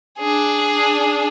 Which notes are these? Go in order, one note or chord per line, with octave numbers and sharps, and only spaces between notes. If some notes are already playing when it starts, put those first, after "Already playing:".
D4 G#4